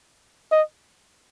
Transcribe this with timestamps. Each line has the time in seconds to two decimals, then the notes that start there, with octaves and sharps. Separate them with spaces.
0.52 D#5